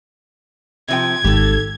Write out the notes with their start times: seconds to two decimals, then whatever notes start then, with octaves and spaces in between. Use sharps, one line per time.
0.88 C3 F3 G5 G#6
1.24 G#1 G#2 G4 A4